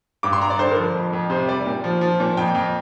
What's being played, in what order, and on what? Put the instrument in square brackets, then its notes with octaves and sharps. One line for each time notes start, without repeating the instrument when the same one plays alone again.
[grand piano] G2 D6
C6
G2 A#5
D5
D3 C5
A#4
F3
F2
F2
C3 C5
G3 D5
A#2
F3
F3
A#2
F2 G5
F2